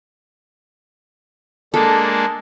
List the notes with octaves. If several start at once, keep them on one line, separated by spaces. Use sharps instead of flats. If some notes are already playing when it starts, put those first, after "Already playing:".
G#3 A#3 D4 A4